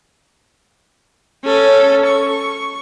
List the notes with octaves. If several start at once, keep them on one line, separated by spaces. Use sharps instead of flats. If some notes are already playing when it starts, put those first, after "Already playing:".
C#4 A4
C#6